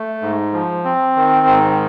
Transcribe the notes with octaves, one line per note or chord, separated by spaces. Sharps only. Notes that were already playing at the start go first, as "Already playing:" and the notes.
Already playing: A3
G#2
F3
C4
D#3
G#2